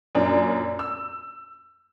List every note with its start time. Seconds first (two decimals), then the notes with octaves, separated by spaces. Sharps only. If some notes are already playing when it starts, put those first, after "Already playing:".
0.15 F#2 A#2 C#4 D4
0.79 E6